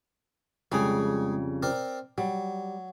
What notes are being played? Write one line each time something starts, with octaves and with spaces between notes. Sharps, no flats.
F2 C#3 G3 G#3 G#4
C4 A#4 D5
F#3 G3